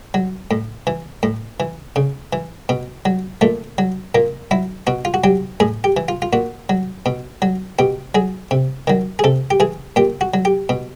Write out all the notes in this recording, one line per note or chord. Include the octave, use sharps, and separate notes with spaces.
F#3
A2
E3
A2
E3
C#3
E3
B2
F#3
A#2 A3
F#3
A#2 A#3
F#3 E4
B2 F#4
F4
F#4
F#3 G4
A2 G#4
G4
E3
F4
F4
A#2 F#4
F#3
B2
F#3
B2 G4
F#3 G#4
C3
D#3 F#3
G#4
C3 A4
G4
E3 G#4
A#2 G4
F#4
F#3
G4
B2